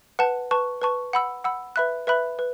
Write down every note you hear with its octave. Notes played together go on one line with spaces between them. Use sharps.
B4 F#5 A5
B4 A5 C#6
B4 A5 C#6
F#5 B5 E6
F#5 B5 E6
B4 E5 B5 F#6
B4 E5 B5 F#6
B4